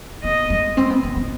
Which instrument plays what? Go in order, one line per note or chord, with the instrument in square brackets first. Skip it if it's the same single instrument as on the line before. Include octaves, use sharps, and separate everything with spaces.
[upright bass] B3 [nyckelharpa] D#5
[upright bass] G#3
C4
B3
B3
B3